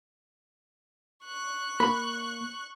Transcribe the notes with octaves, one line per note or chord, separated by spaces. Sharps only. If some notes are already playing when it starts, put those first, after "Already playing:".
C#6 F#6
A#3 B5